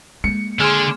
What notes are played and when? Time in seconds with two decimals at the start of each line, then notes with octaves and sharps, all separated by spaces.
0.24 G#3 A#3 C#7
0.60 D3 G#4 C6 F6